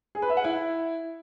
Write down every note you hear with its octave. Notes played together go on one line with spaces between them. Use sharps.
G#4
B4
E5
F#5
E4